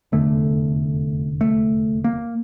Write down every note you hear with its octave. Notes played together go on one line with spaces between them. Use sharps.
F1 E2 D3 A3
A3
A#3